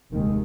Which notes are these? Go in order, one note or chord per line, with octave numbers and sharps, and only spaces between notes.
F1 D#2 D#3 G#3